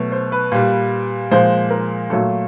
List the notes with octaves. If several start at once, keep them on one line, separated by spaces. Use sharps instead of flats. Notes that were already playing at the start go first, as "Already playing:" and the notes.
Already playing: B2 F#3 A3
C5
B4
A#2 G3
A#2 F3 G#3 C5
A#4
A#2 F#3 A3 A4